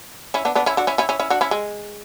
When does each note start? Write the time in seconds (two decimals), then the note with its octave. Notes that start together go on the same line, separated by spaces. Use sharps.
0.34 C#4 E4
0.45 B3 D4
0.55 B3 D4
0.66 C#4 E4
0.77 D4 F#4
0.87 C#4 E4
0.98 C#4 E4
1.09 C#4 E4
1.19 C#4 E4
1.30 D4 F#4
1.41 C#4 E4
1.51 G#3